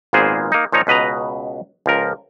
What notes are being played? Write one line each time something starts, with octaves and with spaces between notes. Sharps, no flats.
G#1 A#2 A#3 B3 G#4 C5
A#3 D#4
A#2 F3 D#4 C#5 A#5
C#2 B2 B4 D#5 A#5
C#2 F3 A#4